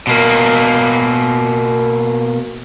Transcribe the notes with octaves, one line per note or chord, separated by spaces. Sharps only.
B2 A#3